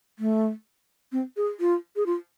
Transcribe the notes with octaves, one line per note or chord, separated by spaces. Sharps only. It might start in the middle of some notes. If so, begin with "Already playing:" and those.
A3
C4
G#4
F4
G#4
F4